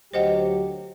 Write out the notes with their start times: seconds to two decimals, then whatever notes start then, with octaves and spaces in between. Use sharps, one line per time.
0.14 D2 F#3 G4 C5 D#5 F#5